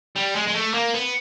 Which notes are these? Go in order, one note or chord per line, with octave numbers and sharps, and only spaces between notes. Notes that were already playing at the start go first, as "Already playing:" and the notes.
G3
G#3
G#3
A3
A#3
B3